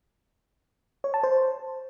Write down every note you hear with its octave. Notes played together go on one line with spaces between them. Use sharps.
C#5
A5
C5